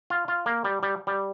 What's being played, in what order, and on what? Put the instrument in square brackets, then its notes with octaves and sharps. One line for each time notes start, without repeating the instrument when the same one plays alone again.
[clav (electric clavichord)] F4
F4
A#3
G3
G3
G3